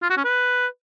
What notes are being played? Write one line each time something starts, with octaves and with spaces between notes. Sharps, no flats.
F4
F#4
C#4
B4